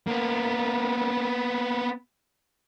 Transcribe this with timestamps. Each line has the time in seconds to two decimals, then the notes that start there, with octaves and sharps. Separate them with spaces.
0.07 A#3 B3